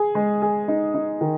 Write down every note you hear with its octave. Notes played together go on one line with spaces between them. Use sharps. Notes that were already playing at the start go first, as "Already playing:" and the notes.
Already playing: G#4
G#3
G#4
D#4
D#4
D#3